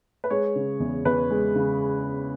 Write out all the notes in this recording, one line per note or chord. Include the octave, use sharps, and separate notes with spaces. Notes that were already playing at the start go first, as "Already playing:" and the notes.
B4
G#3 C#5
C#3
E2
E2 B4
G#3
C#3